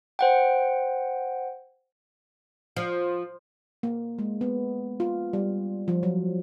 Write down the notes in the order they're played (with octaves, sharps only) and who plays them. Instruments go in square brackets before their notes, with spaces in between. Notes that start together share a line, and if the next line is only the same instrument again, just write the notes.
[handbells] C5 F#5 G5
[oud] F3
[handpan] A#3
G#3
B3
F4
G3
F3
F#3